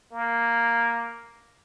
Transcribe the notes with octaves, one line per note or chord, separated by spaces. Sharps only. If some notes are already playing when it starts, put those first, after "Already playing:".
A#3